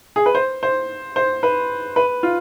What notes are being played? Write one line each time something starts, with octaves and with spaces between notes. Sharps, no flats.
G#4
B4
C5
C5
C5
B4
B4
F4